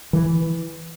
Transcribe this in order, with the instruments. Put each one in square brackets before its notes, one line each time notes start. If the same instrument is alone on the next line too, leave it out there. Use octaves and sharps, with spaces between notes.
[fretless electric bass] E3